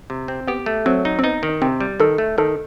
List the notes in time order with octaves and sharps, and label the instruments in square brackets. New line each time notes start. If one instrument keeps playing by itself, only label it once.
[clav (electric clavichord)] C3
C4
[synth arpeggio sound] B3 [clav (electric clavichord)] G4
[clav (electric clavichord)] A3
[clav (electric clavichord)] F#3 [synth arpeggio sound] C4
[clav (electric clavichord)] D#4
[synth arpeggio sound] C4
[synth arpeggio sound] B3 [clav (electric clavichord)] D#4
[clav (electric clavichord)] D#3
[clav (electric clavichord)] C3 [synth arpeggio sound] C4
[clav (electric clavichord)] G3
[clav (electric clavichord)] D#3 [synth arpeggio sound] A4
[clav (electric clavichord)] A3
[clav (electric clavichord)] D#3 [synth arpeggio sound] A4